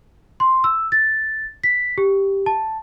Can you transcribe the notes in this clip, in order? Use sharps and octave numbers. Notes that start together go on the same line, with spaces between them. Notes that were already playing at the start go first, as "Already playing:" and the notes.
C6
E6
A6
B6
G4
A5